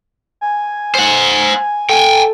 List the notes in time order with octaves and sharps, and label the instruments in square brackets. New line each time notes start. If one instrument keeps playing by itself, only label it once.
[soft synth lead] G#5
[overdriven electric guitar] C5 F#5
[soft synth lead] A4 [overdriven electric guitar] G5 G#5